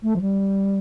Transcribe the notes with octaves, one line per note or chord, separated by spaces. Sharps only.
A3
F3
G3